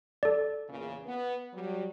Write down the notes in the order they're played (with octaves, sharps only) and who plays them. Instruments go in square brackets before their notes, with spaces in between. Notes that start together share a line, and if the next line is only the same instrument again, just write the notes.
[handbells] A4 D5
[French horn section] E2 A#2 C#3
B3
F#3 G3